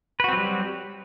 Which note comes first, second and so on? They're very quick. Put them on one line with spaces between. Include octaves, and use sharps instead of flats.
B4 F#4 C4 F#3 G3